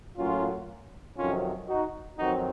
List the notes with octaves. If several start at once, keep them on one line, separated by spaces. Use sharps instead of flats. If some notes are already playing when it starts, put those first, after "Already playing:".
A2 F#3 A#3 C#4 F4
F2 C3 D#3 F#3 C#4 F4
D#4 F#4
F2 D#3 F#3 C4 D#4 F#4